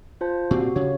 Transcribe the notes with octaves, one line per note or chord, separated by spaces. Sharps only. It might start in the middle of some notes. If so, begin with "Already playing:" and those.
F4 C5 A5
A#2 C4 F#4 G4
C#3 C#5